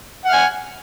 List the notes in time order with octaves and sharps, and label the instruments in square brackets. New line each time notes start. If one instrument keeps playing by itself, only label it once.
[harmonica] F#5
F6
G#5